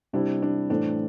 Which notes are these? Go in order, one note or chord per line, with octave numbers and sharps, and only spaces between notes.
C3 G3 C4 D4 E4
D4
A2 E3 A3 C4 D4